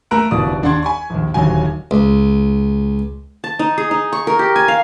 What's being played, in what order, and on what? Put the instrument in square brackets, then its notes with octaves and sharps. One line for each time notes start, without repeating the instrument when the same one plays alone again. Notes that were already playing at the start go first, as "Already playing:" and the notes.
[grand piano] A3 A#4 A#5 E6 F#6 D7
F1 D2 B2 E3 D5 D#6
D#2 D4 D5 F#5 C6 G#6
G#5 B5 C#6
A#1 D#2
D#1 D2 D#3 F#3 G#5
[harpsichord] C#2
[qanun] A5
D#4
G#4
D#4
C#6
A#4
G4
G#5
F5